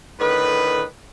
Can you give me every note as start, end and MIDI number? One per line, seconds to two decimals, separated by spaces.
0.20 0.84 45
0.20 0.84 50
0.20 0.84 51
0.20 0.84 71